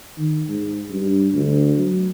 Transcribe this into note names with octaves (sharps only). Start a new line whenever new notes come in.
D#3
G#2
G2
D2
F#3